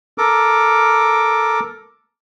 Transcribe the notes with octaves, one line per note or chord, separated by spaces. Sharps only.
A4 A#4 D6